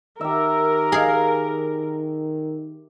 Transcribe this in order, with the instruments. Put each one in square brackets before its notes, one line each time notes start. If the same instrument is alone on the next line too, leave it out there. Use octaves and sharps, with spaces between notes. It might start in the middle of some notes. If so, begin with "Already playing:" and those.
[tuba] D#3 [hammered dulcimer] G4 E5 [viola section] A#4
[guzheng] G#4 F5